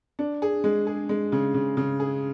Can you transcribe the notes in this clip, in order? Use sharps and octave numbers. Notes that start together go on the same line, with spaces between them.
D4
G#4
G#3
G#4
G#3
C#3
C#3
C#3
G#4